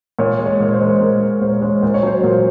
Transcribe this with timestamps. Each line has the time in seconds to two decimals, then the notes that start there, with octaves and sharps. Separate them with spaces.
0.19 A#2 C#5
0.39 G#3
0.46 C#5
0.60 A#2
0.73 C5
0.81 G#3 A#4
0.90 C5
1.01 A#2 A#4
1.21 G#3
1.41 A#2 C5
1.52 C5
1.61 G#3 C#5
1.83 A#2 C5
1.94 C#5
2.03 F#3 C5
2.20 A#2 C#5
2.32 C5